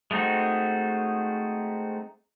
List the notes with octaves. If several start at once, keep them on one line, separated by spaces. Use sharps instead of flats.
G#3 A3 C4 D#4 F#4